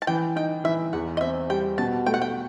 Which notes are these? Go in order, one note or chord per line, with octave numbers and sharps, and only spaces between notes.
A5
E3 G5
D#4 G5
E3 E5
E2 F#5
D#5
C4 E5
G3 G5
B2 A5
A3 G5
F#5
G5